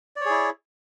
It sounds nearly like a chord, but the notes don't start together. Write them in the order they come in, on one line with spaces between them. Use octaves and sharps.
D5 C#5 G#4 E4